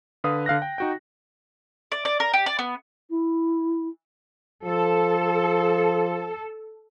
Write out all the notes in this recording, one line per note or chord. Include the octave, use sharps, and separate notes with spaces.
D3 B4 F5 D#6
D3 F5 F#6 A#6
G5
D#4 F#4 G5
D5
D5
A#4
G4
D5
B3
E4
F3 A4